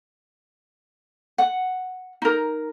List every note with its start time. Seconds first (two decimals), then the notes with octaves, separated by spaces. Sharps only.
1.38 F#5
2.22 D#4 A#4